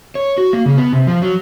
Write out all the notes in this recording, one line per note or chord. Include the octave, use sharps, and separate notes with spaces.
C#5
F#4
A#3
C#3
B3
C3
F3
F#3